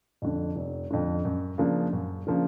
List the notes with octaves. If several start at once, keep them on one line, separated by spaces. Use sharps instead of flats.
F2 D3
F1
F2 D3
F#2
C#3 F3 A#3 D4
F#2
C#3 F3 A#3 D4